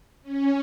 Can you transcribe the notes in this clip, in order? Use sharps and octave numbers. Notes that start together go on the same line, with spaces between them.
C#4